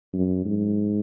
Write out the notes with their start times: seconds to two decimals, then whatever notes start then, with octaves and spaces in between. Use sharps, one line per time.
0.14 F#2
0.46 G#2